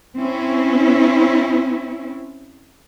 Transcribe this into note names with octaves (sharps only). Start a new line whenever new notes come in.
C4 C#4 E4